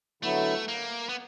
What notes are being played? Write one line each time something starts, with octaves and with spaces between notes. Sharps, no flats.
D3 F#3 A3 B3 E4
A#3
B3